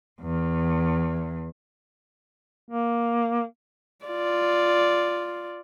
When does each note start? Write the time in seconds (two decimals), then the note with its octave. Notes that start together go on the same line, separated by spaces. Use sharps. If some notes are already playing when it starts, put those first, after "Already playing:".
0.21 E2
2.70 A#3
4.06 F4 D5